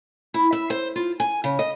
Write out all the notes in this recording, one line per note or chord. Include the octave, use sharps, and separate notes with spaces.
E4
E5
C5
F4
G#5
C#3
D#5